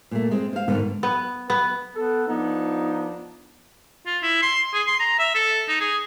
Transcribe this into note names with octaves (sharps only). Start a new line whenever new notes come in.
A#2 A3
G#3 C4
C5 F5
G#2 B2 D3 D#3 B3
B3
B3
B3 A4
F3 B3 D4 D#4
F4
E4
C6
G#4
C6
A#5
E5
A4
D#4
G#4